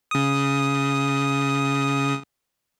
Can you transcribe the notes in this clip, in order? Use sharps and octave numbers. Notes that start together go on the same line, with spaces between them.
C#3 D#6